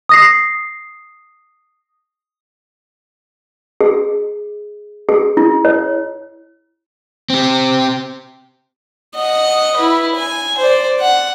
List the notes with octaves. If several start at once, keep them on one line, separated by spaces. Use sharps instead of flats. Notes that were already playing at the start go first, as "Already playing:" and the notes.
D#6 A#6 C7
G#4
G#4
E4
C#5
C4 G4
D#5 F#5
E4 B4
G#5
C5 D5
F#5